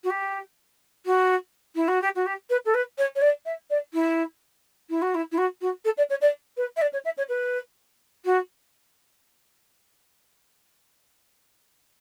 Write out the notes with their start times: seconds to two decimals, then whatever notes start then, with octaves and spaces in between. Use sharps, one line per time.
0.04 F#4
0.10 G4
1.06 F#4
1.75 E4
1.88 F#4
2.02 G4
2.16 F#4
2.26 G4
2.50 B4
2.66 A4
2.74 B4
2.98 C#5
3.16 C#5
3.22 D5
3.45 E5
3.70 D5
3.94 E4
4.90 E4
5.02 F#4
5.15 E4
5.32 E4
5.38 F#4
5.61 F#4
5.85 A4
5.97 D5
6.10 C#5
6.21 D5
6.57 B4
6.77 E5
6.82 D5
6.93 C#5
7.05 E5
7.18 C#5
7.29 B4
8.25 F#4